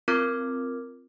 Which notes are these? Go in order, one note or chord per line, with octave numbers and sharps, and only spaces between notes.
C4 F4 A#4 D6 F6 G#6